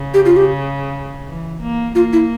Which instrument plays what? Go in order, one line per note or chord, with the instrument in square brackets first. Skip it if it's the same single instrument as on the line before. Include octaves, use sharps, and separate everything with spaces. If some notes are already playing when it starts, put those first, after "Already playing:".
Already playing: [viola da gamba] C#3
[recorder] G4
F4
G4
[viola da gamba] E3
A#3
[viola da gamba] A#3 [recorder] F4
[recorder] E4